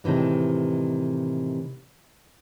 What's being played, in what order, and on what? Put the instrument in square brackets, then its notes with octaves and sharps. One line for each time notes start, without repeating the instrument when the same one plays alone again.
[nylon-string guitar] A2 C3 D#3 E3 G#3